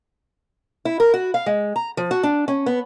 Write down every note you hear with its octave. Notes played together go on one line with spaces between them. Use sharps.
E4
A#4
F#4
F5
G#3
A#5
F3
F#4
D4
C#4
B3